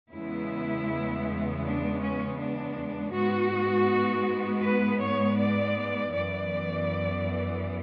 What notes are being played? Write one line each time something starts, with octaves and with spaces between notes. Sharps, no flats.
E2 C#3 G#3 B3 E4
D4
C#4
D4
G#2 G#3 B3 F#4
B4
C#5
D5
F#2 E3 B3 D5